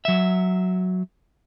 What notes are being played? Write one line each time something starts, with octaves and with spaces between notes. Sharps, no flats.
F#3 E5